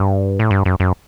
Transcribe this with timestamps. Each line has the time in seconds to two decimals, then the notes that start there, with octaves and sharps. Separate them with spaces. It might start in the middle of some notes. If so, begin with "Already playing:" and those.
Already playing: G2
0.39 A2
0.51 G2
0.66 F#2
0.80 F#2